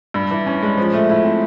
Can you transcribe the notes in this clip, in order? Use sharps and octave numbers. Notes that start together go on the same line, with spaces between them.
G2
E3
C#4
G#3
F3
A3
E4
C4